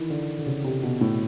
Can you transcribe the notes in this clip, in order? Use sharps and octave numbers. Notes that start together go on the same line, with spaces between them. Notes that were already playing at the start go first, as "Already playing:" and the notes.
Already playing: D#3 E3
D3
D3
C#3
C3
B2
A2